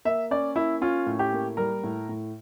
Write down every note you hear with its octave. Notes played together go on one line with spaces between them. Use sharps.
A#3 E5
C#4 D5
A#3 E4
C#4 F4
A2
G4
A#3
G3 A#4
A2
A2